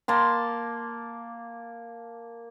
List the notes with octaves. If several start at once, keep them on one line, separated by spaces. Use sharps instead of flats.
A#3 A5 C6